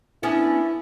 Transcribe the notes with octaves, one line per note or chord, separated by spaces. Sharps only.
B3 C#4 D4 E4